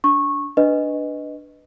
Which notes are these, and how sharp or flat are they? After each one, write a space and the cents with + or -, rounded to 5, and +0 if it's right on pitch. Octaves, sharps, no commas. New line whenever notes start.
D4 -20 C#6 -15
D4 +0 B4 +0 D#5 +0